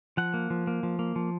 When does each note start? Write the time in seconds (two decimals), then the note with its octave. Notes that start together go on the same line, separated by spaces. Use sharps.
0.17 F3 F#5
0.34 A#3
0.50 F3
0.67 A#3
0.83 F3
0.99 A#3
1.16 F3